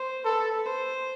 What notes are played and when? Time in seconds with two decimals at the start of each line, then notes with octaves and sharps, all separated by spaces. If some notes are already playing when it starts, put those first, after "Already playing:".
Already playing: C5
0.25 A4 B4
0.66 C5